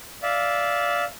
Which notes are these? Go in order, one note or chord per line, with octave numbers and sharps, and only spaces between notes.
D5 E5 F5